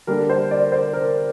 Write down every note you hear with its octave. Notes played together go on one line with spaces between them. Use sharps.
D3 G3 A#3 D4 A#4
C5
D5
C5
A#4